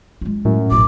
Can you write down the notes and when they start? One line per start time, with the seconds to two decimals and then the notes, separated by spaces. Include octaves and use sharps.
0.21 G#3 F4
0.45 F#2 A2
0.71 E1 A1 D6